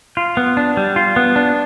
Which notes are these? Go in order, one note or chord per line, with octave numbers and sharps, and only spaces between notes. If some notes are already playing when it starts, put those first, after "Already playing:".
F4
B3
D4
G3
F4
B3
D4